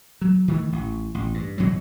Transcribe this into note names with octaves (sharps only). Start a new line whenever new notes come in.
F#3
D#3 E3 A3
A1
A1
G2
G1 B2 E3 F#3